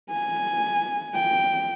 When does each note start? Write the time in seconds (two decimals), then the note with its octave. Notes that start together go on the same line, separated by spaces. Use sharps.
0.11 G#5
1.15 G5